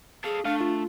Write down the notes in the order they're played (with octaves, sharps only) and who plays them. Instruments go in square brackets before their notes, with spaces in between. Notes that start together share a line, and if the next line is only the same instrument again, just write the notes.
[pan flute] G#4 [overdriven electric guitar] A4 F5
[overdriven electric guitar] A3 [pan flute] D4 [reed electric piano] F5
[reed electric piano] F4